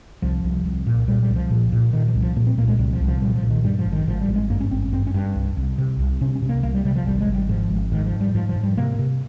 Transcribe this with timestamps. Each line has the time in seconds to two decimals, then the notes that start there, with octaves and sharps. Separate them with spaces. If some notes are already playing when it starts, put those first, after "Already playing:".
0.22 C2 F3
0.44 C2
0.66 C2
0.87 A#2
1.08 A#2 G3
1.23 G3
1.30 C2
1.36 F3
1.50 A#2
1.72 A#2
1.93 A#2 D#3
2.08 F3
2.15 C2
2.22 F3
2.36 A#2 A#3
2.47 C4
2.58 A#2 A#3
2.68 G#3
2.79 C2 G3
2.93 F3
3.01 C2
3.07 F3
3.21 A#2 G3
3.36 F3
3.43 A#2
3.50 D#3
3.64 G2 G3
3.79 F3
3.86 G#1
3.92 D#3
4.07 G#1 F3
4.21 G3
4.28 G#1
4.36 G#3
4.50 G2 A#3
4.60 C#4
4.71 G#1 C4
4.82 C#4
4.92 G2 C4
5.07 C#4
5.14 G2
5.35 C2
5.57 C2
5.78 C3
5.99 C2
6.21 C3 C#4
6.35 C#4
6.42 C3
6.49 A#3
6.63 C2 A#3
6.74 G3
6.85 C3 G3
6.96 F3
7.06 G#1 G3
7.21 G#3
7.28 G#1
7.34 G3
7.49 G#2 F3
7.70 G#1
7.92 G#2 D#3
8.06 F3
8.13 G#2
8.21 G3
8.35 G#2 F3
8.49 F3
8.56 G#2
8.63 G3
8.77 C3 A#3
8.99 C3